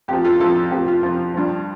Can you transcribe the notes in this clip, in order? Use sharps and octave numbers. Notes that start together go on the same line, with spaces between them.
F2 F3 G4
F4 A4
F2 F3 F4 A4
F2 F3 G4
F4
F2 F3 F4
G2 F3